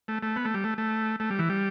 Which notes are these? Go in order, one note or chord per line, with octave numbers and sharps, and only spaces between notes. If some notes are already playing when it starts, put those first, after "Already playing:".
A3
A3
B3
A3
G3
A3
A3
A3
G3
E3
G3